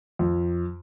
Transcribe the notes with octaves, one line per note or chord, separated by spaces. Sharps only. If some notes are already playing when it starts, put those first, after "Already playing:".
F2